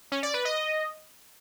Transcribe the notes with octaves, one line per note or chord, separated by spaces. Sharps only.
C#4
D5
B4
D#5